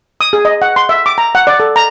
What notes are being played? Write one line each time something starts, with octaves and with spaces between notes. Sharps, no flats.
D#6
G#4
D#5
F#5
C6
E5
D6
A#5
F#5
D5
A4
A#5